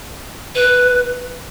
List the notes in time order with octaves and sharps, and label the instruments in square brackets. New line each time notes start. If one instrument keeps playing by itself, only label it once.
[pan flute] B4